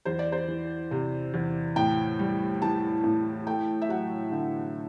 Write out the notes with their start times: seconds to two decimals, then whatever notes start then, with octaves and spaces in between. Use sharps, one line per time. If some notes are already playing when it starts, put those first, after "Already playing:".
0.05 E2 C5
0.19 D5
0.32 C5
0.48 E3
0.91 C3
1.34 E2
1.76 A2 G5
2.19 G3
2.62 E3 A5
3.04 A2
3.47 A3 G5
3.82 E5
3.89 F#3 F#5
4.32 D3